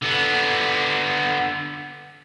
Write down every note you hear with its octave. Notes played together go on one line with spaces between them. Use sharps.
D3 B3